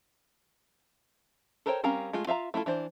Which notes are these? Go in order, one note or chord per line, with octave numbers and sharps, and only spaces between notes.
A4 A#4 C5 C#5 G5
G3 C4 C#4 A#4 F5
G#3 A3 F4
F4 E5 F5 A#5
A3 E4 F4 A4
E3 D4 C5